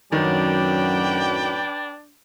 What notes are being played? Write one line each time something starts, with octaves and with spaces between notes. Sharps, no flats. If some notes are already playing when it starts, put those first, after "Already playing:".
F#2 A2 D#3 F#3 D4 B4 D5 G5